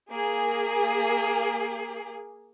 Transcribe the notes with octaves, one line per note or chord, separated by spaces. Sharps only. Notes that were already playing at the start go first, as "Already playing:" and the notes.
A#3 G#4